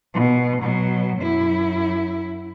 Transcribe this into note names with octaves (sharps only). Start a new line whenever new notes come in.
B2
B2 F#3
F#2 E4